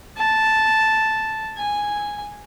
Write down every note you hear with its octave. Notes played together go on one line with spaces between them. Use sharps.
A5
G#5